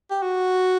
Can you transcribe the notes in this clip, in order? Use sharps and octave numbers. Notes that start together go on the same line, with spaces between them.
G4
F#4